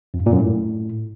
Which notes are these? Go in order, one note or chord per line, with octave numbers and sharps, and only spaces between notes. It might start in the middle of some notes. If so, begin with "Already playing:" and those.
F2
G2
A#2
F#2
A2